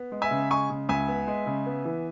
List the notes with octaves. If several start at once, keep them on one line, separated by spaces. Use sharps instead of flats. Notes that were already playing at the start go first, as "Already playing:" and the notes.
Already playing: B3
G#3
E5 G#5
C#3
G#3 G#5 C#6
C#3
C#2 E5 G#5
B3
G#3
C#3
B3
E3